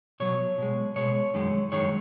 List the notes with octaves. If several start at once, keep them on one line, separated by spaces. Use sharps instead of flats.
B2 F#3 C#5
B2 G#3
B2 G#3 C#5
F#2 D#3 G#3
F#2 D#3 G#3 C#5